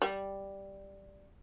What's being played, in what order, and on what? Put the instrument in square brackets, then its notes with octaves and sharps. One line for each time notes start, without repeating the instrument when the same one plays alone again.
[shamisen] G3